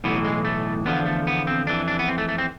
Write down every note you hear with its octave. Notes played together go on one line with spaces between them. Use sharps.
B1 A2 E3 B3
G#3
A3
E2 D3 F3 B3
A3
B3
C4
F2 E3 D4
D4
B3
C4
A3
A3
C4